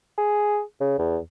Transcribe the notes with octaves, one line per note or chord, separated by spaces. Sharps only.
G#4
C#3
E2